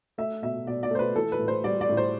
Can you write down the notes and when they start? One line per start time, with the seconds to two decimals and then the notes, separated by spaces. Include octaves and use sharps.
0.18 A3 E5
0.42 B2 E5
0.67 B2 D5
0.83 D5
0.91 A3 C5
0.99 B4
1.16 E3 A4
1.32 B4
1.39 A2
1.48 C5
1.64 G3 D5
1.81 D5
1.89 A2
1.97 C5